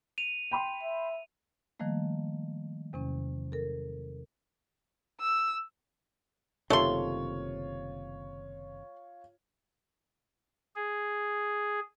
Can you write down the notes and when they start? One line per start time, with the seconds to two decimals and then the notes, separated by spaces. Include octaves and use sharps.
0.18 D#7 F7
0.51 G5 B5 C6
0.83 E5
1.79 D#3 F3 G3 A3 A#3
2.93 E2 C3 F#3 C#4
3.52 A4 A#4
5.20 E6
6.70 F#1 C3 D#3 A3 F4 C#5 C6
10.75 G#4